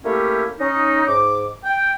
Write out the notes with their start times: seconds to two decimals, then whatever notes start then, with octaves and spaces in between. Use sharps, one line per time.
0.04 A3 A#3 C#4 E4 G4
0.60 C#4 D#4
1.07 G#2 D6
1.64 G5